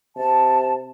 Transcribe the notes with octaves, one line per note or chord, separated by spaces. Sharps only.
C3 A5